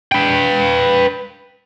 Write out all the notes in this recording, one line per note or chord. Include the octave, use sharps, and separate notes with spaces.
B4 G5